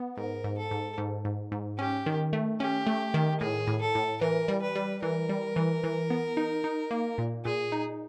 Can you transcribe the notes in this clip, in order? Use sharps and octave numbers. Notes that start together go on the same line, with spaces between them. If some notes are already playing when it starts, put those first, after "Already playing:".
Already playing: B3
G#2 A#4
G#2
A4
G#2
G#2
G#2
G#2
C#4 G4
D#3
A3
C#4 G4
A3
D#3
A2 G#4
A2
A4
A2
E3 A#4
G3
B4
G3
E3 A#4
G3
E3
E3
B3
D#4
D#4
A#3
A#2
A#2 G#4
D#4